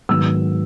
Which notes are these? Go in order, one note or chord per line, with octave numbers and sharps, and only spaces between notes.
G#2 D#3 F#3 B3 E6